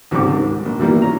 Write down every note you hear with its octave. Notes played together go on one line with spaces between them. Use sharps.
C#2 G#2 D3 G3 C4 D6
D#3
A#1
B2 D#3 E3 G3 A#3
C#4 F4 A#5